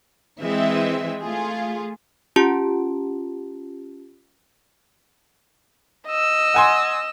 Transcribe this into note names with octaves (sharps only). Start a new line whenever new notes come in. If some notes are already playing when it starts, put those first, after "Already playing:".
E3 G#3 C4 E5
A3 F4 G#4
C#4 F4 G4 A5
D#5 E6
F#5 G#5 C6